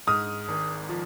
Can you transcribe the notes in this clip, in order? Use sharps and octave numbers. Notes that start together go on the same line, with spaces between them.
G#2 D#6 F6
G#1
F3